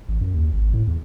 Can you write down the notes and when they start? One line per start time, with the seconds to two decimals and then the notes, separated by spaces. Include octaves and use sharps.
0.08 A1
0.21 F#2
0.34 D#2
0.53 G#1
0.74 A2
0.87 E2